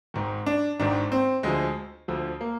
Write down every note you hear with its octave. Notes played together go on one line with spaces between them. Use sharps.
G#1 G#2 D#3
D4
G#1 G#2 D#3 D4
C4
D2 D3 F3 G#3
D2 D3 F3
A#3